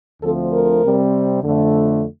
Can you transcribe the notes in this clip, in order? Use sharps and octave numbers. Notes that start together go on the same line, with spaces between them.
D2 D3 F3 A3 C4 A4
A#4
C3 G3 C4
F2 D3 A3